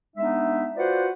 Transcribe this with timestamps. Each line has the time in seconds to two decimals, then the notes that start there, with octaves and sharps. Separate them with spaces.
0.16 G#3 B3 D4 D#4 E5
0.76 F4 F#4 B4 C5 D5 F#5